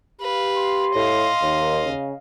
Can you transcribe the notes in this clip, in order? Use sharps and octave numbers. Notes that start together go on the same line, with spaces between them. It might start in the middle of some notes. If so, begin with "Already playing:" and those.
G4 B4 F5
C6
A2 D#5 F5
D#2 D#3
C#3